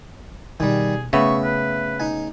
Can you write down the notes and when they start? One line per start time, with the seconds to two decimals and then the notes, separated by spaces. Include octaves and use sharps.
0.60 B2 D#3 G3 G#4
1.13 C#3 A3 B3 E5 C#6
1.44 B4
2.00 D#4 G#5